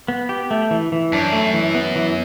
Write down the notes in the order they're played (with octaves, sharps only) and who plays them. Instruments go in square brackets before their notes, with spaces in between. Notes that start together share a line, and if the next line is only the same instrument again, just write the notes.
[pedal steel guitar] B3
G4
A3
E3
E3
[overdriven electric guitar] F#2 [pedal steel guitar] D4
[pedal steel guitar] A3
E3
B3
E3